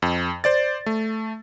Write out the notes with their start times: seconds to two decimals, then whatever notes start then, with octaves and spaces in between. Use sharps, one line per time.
0.02 F2
0.44 C5 D5 A6
0.86 A3